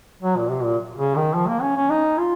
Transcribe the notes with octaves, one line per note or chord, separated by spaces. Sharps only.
F#3
A#2
C3
A#2
C#3
D#3
F3
A#3
C#4
C#4
D#4
F4